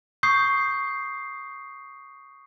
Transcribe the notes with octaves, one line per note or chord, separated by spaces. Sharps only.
C#6 D#6 G6 C7